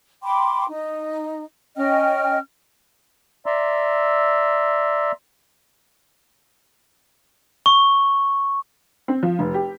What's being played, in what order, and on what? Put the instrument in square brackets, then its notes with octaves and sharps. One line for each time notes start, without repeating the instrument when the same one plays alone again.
[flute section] G5 B5 C6 D6
D#4
C#4 D#5 G5 F6
[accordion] D5 E5 A#5 C6 E6
[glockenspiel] C#6
[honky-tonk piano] C4
F3
F1
G4